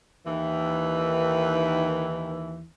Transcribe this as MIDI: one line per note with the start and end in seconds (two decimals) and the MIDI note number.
0.26 2.65 39
0.26 2.65 51
0.26 2.65 52